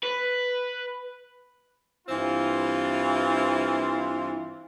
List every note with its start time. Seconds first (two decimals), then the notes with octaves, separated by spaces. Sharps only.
0.03 B4
2.08 G2 E3 C4 F4